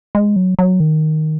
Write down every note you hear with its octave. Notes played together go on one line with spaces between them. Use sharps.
G#3
F#3
F#3
D#3